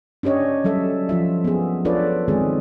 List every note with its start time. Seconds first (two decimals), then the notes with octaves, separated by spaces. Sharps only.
0.23 C#4 D4 G4 C#5 D#5
0.64 F#3 G3 A4 E5
1.09 F3 F4 E5
1.45 B3 G#4
1.85 D4 F4 A4 B4 C#5 D5
2.28 D#3 G#3 C4 G#4